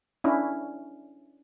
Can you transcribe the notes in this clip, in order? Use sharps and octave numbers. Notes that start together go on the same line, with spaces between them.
C#4 D4 E4